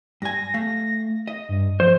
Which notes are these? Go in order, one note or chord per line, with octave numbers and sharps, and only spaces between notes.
G2 G#5 A#6
A3 F5
D#5
G2
F3 C5